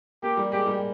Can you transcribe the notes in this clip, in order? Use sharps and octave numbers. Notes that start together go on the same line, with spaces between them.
A#3 G4
G3
G#3 G4
G3